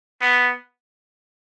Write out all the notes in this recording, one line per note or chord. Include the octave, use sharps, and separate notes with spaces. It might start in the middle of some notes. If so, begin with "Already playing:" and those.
B3